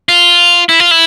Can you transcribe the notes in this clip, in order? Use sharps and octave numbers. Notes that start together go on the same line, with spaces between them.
F4
E4
F4
E4